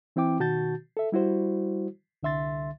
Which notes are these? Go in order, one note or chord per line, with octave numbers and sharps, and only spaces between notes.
E3 C4 E4 G5 D6
B2 D#3 F#4 A5 G6 A6
A4 E5
G3 E4 F#4 C5
C2 D3 E5 C6 A6